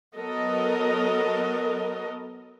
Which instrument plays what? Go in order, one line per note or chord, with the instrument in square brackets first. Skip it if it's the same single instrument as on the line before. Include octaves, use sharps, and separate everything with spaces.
[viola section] F#3 B3 A4 A#4 D#5